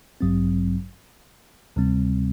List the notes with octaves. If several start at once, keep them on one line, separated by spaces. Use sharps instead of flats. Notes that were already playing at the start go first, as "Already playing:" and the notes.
A1 G2 F#3 C4
D2 C3 G3 C4